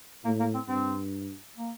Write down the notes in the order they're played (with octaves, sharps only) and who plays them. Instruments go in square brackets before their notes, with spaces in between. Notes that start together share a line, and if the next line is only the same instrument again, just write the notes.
[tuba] A2 [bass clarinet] A#3
[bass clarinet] A#3
C4
[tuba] G2 [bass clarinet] C4
[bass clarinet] A#3